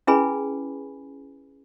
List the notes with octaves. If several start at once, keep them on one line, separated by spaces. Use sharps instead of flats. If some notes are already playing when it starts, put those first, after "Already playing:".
C#4 E4 G#4 B4 G#5 B5